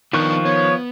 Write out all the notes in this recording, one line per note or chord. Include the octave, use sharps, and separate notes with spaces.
D#3 F3 B3 D4 D#4 C#6 F#6
B3 C#5